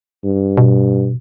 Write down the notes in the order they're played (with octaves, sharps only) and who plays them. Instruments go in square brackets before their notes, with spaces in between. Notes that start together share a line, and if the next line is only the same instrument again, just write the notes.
[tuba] G2
[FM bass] B2